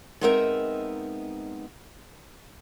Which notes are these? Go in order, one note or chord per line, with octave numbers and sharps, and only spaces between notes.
G#3 B3 C4 D#4 A#4 E5